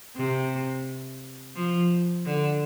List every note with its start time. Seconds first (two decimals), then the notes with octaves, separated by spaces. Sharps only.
0.16 C3
1.56 F3
2.26 D3